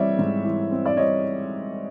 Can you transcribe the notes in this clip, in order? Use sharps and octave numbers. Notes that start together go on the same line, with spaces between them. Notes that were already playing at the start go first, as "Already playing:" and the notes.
Already playing: E3 G3 C4 C#5 D5 E5
G#2
E3
C4
D5
G3 C#5 D#5